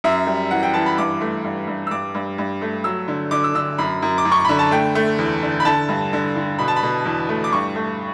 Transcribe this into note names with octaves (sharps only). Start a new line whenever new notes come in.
F#2 E5
G3
E3 F#5
G5
E3 A5
B5
G2 D6
A3
G2
G2
E6
G2 D6
G2
G2
A3
F#3 E6
D3
D3 D6
E6
D3 E6
F#2 B5
F#2
D6
F#2
C#6
D3 B5
A5
A3 G5
A3
E2
D3
B5
D3 A5
G2
D3
D3
B2 B5
A5
B5
B2
E2
A3
D6
G2 C#6
A3